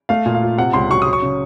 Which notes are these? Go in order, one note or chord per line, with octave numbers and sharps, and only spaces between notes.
A3 F5
A#2
F5
F4
C3 F#5
C#2 C6
F#3 C#6
F#3 D#6
C#6
C#3